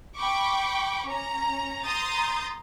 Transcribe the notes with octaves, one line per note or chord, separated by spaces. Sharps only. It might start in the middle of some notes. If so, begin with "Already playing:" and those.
G5 B5 C#6 D6
C#4 A#5
A#5 C6 D#6 G6 A6